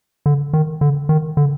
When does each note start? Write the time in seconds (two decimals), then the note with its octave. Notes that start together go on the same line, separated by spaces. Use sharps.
0.26 D3
0.53 D#3
0.81 D3
1.09 D#3
1.37 D3